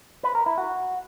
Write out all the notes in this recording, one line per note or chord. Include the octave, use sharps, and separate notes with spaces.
B4
A#4
E4
F#4